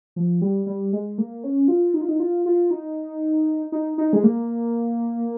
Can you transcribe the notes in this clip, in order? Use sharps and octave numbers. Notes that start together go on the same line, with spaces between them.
F3
G3
G3
G#3
A#3
C#4
F4
D#4
F4
D#4
F4
F4
D#4
D#4
D#4
G#3
A#3